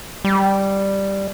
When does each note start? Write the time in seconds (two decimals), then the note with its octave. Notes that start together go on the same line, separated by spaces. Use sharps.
0.24 G3